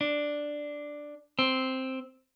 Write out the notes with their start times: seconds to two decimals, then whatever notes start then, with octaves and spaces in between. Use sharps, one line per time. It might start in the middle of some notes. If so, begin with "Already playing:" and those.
0.01 D4
1.39 C4